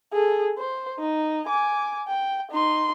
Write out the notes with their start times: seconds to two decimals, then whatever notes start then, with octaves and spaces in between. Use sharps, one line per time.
0.13 G#4 A4
0.58 C5
0.99 D#4
1.46 G#5 D6
2.08 G5
2.52 D#4 C6